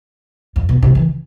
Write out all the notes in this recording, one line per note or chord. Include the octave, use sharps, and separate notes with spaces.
F2
B2
C3
E3